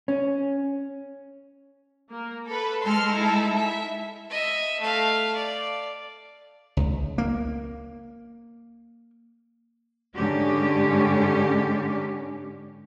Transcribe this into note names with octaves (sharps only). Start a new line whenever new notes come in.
C#4
A#3
A4 B4
G#3 A4 C6 F6
D#4 E4
E5
D#5 E5
A3 F5
D5
C#2
A#3
G#2 D3 C#4 G4